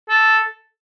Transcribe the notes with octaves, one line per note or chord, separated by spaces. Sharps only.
A4